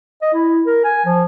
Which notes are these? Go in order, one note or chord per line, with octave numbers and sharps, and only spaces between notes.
D#5
E4
A#4
G#5
F3